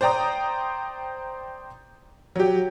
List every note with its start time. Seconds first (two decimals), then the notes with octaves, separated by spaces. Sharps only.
0.01 C5 D5 G5 A#5 D#6
2.36 F#3 G4